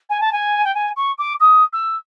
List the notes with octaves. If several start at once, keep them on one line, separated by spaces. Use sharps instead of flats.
G#5
A5
G#5
G5
G#5
C#6
D6
D#6
E6